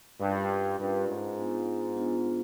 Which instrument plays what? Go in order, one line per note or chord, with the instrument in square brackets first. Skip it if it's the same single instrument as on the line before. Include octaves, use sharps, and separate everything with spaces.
[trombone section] G2 [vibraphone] C#4 F4 A#4
[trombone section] G2 [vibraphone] C#4 F4 A#4
[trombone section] G#2
[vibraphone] B3 D4 F4
B3 D4 F4